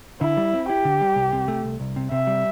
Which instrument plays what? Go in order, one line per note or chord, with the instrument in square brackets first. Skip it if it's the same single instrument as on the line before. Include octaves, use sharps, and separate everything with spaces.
[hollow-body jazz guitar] D3 [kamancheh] E4
[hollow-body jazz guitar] G3
C4
[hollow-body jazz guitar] E4 [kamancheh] G4
[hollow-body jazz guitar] D3
G3
C2
C3
A3
C2
C2
C3
[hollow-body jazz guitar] C3 [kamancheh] E5
[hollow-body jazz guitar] G3